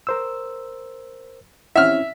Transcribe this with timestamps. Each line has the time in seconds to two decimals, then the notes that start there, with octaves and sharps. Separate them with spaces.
0.07 A#4 C5 E6
1.76 C4 C#4 E4 E5 F6